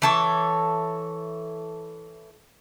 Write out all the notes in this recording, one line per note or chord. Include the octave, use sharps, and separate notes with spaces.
E3 A4 C#5